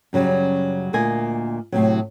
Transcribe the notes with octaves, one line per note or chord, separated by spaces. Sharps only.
F#2 C#3 F#3 G3
D2 A#2 A#3 D#5 G#5
A2 C3 F#3